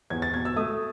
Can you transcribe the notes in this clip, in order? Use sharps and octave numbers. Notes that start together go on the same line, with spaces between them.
E2 G#6
A6
B2 G#6
E6
A3 D#6